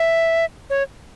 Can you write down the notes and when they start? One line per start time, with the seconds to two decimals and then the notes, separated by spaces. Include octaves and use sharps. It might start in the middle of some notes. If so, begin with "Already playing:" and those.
Already playing: E5
0.70 C#5